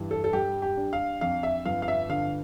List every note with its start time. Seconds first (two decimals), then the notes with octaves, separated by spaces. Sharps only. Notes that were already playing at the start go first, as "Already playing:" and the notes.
Already playing: G2 E3
0.11 A4
0.24 A4
0.33 G3 G4
0.62 G4
0.77 D4
0.93 F5
1.21 F2 F5
1.43 E5
1.66 G1 F5
1.82 F5
1.88 E5
2.09 D3 F5